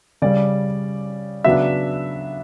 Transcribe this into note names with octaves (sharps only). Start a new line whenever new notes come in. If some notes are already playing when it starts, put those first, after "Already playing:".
C#3 G3 C#4 D5
C#3 F#3 B3 D4 E5